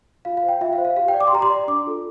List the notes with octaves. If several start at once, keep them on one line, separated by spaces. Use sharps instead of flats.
F4 F5
F5
C5
G5
F4 E5
F5
C5
F5
G4 F5
G5
D5
D6
C6
G4 A#5
C6
D5
D4 D6
F4 A4